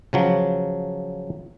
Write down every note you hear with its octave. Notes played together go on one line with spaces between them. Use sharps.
C#3 F3 F#3